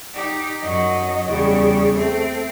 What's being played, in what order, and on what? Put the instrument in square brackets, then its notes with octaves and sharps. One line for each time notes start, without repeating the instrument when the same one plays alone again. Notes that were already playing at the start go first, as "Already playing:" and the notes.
[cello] D#4 G4
[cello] F#2 F#3 [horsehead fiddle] D#5
[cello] E2 C#3 [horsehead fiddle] G3 G#4
[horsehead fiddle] A3 [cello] C4